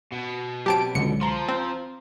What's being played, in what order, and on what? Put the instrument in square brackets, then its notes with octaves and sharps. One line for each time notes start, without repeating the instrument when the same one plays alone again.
[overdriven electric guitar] B2
[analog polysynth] F#3 C4 [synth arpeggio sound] G4 A5 D7
[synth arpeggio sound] C#2 C#7 [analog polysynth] D3 F#3
[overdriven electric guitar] F3 [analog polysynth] A#5 C6
[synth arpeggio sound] C4